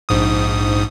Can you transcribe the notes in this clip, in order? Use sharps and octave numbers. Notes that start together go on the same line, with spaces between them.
A#1 G#2 D#6